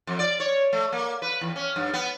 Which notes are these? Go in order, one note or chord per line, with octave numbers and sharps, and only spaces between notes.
F2
D5
C#5
A3
A#3
B4
E2
C#4
G2
B3